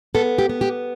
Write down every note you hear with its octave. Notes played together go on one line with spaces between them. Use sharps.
B3 A4
G4
B3
G4